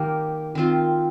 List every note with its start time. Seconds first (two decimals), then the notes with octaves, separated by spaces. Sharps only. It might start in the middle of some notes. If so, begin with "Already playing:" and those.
Already playing: D#3 A#3 G4 A#4
0.55 D#3 C4 F4